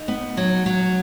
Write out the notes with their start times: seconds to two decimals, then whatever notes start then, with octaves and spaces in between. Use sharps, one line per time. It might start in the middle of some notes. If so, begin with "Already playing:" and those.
Already playing: D#4
0.08 B3
0.37 F#3
0.66 F#3